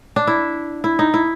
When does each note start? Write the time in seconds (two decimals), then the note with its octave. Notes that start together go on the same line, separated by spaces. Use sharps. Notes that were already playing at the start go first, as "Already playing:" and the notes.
0.16 D4
0.27 E4
0.84 E4
0.99 D#4
1.14 E4